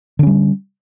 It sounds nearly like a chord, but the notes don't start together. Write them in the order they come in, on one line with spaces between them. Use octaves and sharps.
D3 C#4 G3